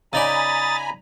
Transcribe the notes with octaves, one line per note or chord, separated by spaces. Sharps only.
C#3 D#4 D5 G#5 A#5 B5 D#6 A6